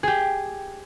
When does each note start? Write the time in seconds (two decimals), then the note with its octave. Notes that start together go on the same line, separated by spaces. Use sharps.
0.03 G4 G#4